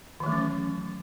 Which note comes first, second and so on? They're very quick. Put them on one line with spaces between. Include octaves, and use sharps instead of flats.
D#3 E3 A3 F#3 C#4